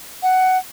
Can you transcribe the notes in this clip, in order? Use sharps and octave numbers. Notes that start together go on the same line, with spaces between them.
F#5